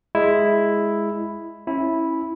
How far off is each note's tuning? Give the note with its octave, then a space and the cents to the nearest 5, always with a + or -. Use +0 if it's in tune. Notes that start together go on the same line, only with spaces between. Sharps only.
G#3 +0 E4 +0
C#4 -20 E4 -10